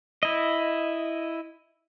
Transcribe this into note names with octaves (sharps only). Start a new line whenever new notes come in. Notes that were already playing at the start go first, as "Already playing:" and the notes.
E4 D#5